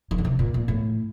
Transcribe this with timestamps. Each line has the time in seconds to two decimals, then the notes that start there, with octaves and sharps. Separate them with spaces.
0.11 D#3
0.18 D3
0.25 C3
0.39 A#2
0.54 A#2
0.68 A2